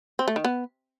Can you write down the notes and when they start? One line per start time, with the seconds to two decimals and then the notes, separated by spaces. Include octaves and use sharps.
0.19 C4
0.28 A3
0.36 D#3
0.45 B3